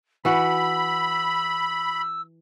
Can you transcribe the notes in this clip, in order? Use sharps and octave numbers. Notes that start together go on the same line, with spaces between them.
E3 F#4 B5 E6